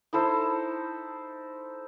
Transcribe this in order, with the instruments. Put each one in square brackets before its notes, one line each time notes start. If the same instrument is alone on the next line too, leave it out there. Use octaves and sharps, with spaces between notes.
[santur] D#4 E4 A4 C5